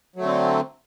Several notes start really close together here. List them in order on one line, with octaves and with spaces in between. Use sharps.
F#3 A3 D3 C4